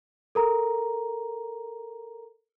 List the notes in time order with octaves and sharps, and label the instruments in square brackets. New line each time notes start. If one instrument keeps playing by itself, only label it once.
[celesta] A4 A#4 A#5